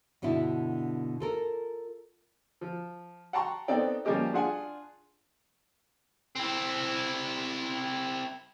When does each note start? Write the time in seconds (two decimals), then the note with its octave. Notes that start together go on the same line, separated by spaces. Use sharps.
0.22 G2 B2 D3 B3 E4
1.20 F4 A4 A#4
2.61 F3
3.33 F#5 G5 A5 A#5 C6 C#6
3.68 B3 C4 D#4 A4 D5 G5
4.05 F3 G3 A#3 C#4 G4 D#5
4.33 D4 F4 G#4 F#5 G#5
6.36 C4 E4